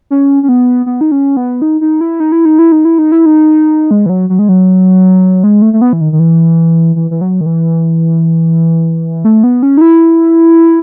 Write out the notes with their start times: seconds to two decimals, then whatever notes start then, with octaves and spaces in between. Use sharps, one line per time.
0.10 C#4
0.43 C#4
0.49 B3
0.86 B3
1.01 D#4
1.12 C#4
1.37 B3
1.62 D#4
1.81 D#4
2.01 E4
2.20 D#4
2.32 E4
2.45 D#4
2.59 E4
2.72 D#4
2.85 E4
2.98 D#4
3.12 E4
3.26 D#4
3.91 G#3
4.06 E3
4.09 F#3
4.30 F#3
4.39 G#3
4.49 F#3
5.44 G#3
5.62 A3
5.73 A3
5.81 B3
5.93 E3
6.01 D#3
6.12 D#3
6.19 E3
6.96 E3
7.11 E3
7.21 F#3
7.41 D#3
7.46 E3
9.25 A3
9.44 B3
9.63 C#4
9.77 D#4
9.81 E4